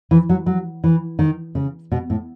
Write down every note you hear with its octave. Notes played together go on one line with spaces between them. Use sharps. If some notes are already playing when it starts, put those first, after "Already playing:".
E3
F#3
F#3
E3
D#3
C#3
B2
A2